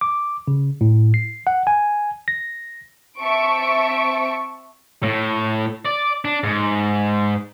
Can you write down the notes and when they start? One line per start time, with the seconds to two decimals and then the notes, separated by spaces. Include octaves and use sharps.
0.01 D6
0.48 C#3
0.81 A2
1.14 C7
1.47 F#5
1.67 G#5
2.28 A#6
3.19 C4 E5 A5 C#6 D7
5.03 A2
5.86 D5
6.25 D4
6.44 G#2